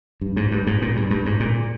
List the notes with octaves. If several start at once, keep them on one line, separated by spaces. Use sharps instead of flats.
G2
G#2
G2
G#2
A#2
G2
G2
G#2
A#2